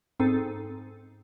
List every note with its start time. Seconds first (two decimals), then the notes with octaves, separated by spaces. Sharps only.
0.20 G#2 C4 D#4 A4